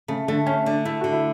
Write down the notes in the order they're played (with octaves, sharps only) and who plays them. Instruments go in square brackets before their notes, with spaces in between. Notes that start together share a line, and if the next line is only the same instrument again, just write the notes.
[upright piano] C#3 [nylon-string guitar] A3
[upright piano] D3 [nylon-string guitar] A3
[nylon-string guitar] D2 [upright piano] C#4
[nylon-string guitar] D3 [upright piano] D4
[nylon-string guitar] A3 [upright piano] E4
[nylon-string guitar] D3 [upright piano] F#4
[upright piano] E4